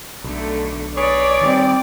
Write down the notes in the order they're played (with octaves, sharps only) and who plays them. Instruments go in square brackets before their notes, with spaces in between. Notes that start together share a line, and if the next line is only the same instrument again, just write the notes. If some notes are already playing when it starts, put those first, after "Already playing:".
[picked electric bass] B1 [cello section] D3 A3
[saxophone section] G#4 B4 C#5 [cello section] D5
[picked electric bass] D#3 F3 G3 [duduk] C4